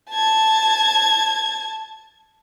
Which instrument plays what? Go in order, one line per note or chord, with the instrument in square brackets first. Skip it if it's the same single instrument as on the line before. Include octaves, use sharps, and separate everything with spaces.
[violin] A5 G#6